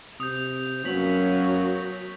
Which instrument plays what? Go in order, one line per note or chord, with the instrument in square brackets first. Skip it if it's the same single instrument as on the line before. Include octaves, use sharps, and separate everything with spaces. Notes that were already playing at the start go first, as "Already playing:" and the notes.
[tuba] C3 [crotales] D#6 G6
[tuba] F#2 [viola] F#3 [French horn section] A#3 B3 C#4 [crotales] B6 F#7